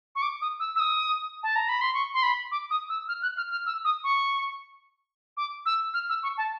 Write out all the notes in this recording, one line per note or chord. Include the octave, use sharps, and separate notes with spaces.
C#6
D6
D#6
E6
E6
D#6
A5
A#5
B5
C6
C#6
C6
B5
D6
D#6
E6
F6
F#6
F6
F6
E6
D#6
C#6
D6
E6
F6
E6
C#6
A5